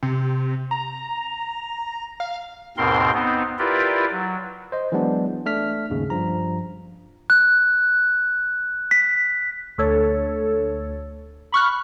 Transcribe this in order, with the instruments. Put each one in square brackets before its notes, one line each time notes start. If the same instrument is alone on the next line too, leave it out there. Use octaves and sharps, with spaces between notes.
[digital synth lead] C3
A#5
F5
[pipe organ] D#2 G#2 B2 C4 A#4 C6
B3 C4 D#4
E4 F4 G4 A#4 B4 D5
F#3
[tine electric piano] C5 D#5
E3 F#3 G#3 B3 D4
A3 D4 F6 B6
D#2 G#2 C#3
G2 F3 A#5
[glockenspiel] F#6
B6
[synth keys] D2 A4 C#5
B5 C#6 F6 F#6